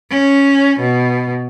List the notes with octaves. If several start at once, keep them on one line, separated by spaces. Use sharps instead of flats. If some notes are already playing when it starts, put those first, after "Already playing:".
C#4
B2